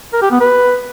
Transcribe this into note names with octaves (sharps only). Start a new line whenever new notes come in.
A#4
G4
B3
B4